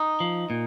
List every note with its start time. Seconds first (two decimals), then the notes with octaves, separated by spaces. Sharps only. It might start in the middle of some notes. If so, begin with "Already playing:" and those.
Already playing: D#4
0.20 F3
0.50 A#2